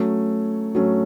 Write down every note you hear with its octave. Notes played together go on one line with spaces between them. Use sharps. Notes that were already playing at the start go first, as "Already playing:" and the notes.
Already playing: F#3 A3 C#4
F#3 A3 C#4